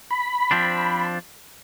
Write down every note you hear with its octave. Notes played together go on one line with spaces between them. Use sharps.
B5
F3 C4 D4